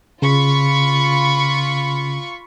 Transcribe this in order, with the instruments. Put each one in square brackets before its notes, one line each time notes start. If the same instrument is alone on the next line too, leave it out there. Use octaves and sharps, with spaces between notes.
[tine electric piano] C#3 [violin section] F4 B5 C#6